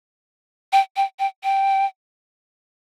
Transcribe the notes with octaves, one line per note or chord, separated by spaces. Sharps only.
G5
G5
G5
G5